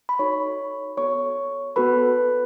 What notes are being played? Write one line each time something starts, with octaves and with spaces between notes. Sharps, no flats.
B5
D#4 F#4 A4 C#5 C#6
B3 F#4 A4 C#5 C#6
B3 F#4 A4 B4 B5